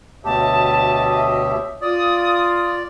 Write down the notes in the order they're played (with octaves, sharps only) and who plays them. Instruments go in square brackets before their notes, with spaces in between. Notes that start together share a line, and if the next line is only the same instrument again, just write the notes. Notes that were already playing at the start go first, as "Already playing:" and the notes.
[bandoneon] D2 B2 G4 [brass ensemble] C#5 D#5 E5 [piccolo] A5
[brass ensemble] F4 [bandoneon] D5 [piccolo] D#6